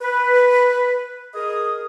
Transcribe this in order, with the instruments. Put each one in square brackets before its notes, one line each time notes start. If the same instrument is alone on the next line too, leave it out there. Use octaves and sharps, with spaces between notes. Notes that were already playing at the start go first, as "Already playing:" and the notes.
[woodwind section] B4
G#4 A#4 D#5 D#6